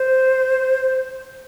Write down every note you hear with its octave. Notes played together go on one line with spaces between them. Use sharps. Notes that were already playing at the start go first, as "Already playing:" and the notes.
Already playing: C5